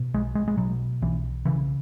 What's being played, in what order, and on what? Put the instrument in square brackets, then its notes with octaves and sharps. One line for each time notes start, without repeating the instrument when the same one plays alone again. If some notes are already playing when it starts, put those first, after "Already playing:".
Already playing: [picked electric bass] B2
B1 G#3
G#3
G#3
B2 F#3
B1 E3
C#3 E3